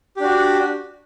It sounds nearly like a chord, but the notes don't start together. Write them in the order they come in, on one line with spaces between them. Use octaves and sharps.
G4 D4 F#4